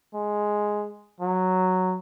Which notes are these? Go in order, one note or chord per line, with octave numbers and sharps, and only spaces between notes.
G#3
F#3